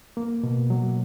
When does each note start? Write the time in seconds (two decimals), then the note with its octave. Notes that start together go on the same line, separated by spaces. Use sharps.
0.17 A#3
0.43 B2
0.70 F#3